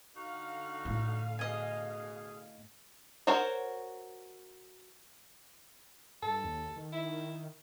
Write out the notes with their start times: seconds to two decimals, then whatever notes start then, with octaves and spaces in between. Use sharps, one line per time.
0.15 D3 D#4 F#4 F5
0.85 A2
1.39 B2 G#4 D#5 G#5
3.27 F#4 A#4 C5 C#5
6.23 G2 A4
6.44 D#2
6.76 D#3
6.93 E4